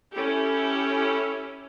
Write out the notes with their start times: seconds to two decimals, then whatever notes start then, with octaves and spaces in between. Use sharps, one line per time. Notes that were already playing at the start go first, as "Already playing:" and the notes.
0.13 C#4 E4 G4 A4